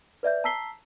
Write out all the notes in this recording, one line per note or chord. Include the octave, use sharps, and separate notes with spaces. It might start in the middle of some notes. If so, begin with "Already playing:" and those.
B4 D5 E5 G6
A5 A#5 E6 B6 C7 G7